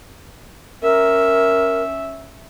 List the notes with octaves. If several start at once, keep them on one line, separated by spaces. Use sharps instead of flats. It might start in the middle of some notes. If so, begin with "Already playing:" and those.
C#4 A#4 E5